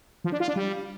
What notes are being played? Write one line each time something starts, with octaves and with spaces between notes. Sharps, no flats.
F3
D4
F4
D4
G3